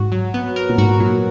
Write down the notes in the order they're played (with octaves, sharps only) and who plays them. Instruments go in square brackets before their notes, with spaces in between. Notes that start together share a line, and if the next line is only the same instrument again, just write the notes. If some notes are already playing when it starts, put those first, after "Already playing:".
Already playing: [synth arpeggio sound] G#2 [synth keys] F#4
[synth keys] F#3
B3
A#4
[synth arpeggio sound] A#2
[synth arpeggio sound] G#2 [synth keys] F#4
[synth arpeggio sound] A#2 [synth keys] F#3